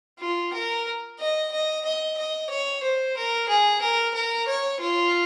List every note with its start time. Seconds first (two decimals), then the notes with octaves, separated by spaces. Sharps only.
0.20 F4
0.54 A#4
1.20 D#5
1.52 D#5
1.85 D#5
2.18 D#5
2.50 C#5
2.83 C5
3.17 A#4
3.49 G#4
3.82 A#4
4.14 A#4
4.48 C#5
4.80 F4